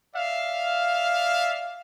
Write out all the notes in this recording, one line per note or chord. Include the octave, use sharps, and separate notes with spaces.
D5 E5 F5